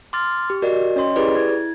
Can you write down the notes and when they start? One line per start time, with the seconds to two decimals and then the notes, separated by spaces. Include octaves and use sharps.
0.13 C6 D6 F6 A6
0.50 G4
0.62 F#4 A#4 D5 D#5
0.96 C#4 C#5 D#5 C6
1.16 E4 G4 G#4 B4 D5
1.34 E4 G#6